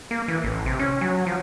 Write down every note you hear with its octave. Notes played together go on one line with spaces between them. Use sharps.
A#3
E3
A1
C3
C#4
F#3
F3